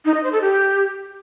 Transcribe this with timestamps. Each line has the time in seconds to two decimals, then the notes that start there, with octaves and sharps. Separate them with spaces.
0.05 D#4
0.14 D#5
0.23 C5
0.32 A4
0.41 G4